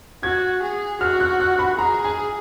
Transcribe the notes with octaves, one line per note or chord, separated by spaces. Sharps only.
F#4 G#6
G#4
F#4 F6
F#6
F#6
B5
G#4 A#5
G#5